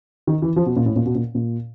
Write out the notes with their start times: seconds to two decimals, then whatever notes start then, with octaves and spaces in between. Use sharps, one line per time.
0.27 D#3
0.42 E3
0.56 F3
0.66 B2
0.76 A#2
0.86 A2
0.96 A#2
1.06 B2
1.15 A#2
1.35 A#2